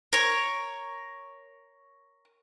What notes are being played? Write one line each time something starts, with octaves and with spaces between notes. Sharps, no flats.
A#4 C#5